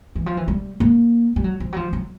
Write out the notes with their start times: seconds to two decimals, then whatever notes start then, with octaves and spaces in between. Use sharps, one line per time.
0.15 E3
0.26 F3
0.37 E3
0.48 G3
0.80 A#3
1.36 G3
1.44 F#3
1.60 F3
1.73 F#3
1.76 F3
1.93 F#3